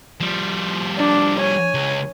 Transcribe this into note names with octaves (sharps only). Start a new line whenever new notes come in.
F3 G3
D4
C#5 G#5
C#2